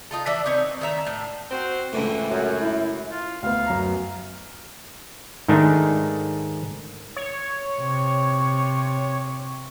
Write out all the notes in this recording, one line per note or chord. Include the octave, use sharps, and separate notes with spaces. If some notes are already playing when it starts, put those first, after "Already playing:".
D#4 F4 A4
E3 D5 E5
C4 D#4 C#5
D#3 A3 E5 A#5
A2
C4 F#4 C5
C#2 A2 D3 E3
F#2
E4
F4
D2 B3 F5
F#2 A#5
G#2 D#3 A3 D4 D#4
C#5
C3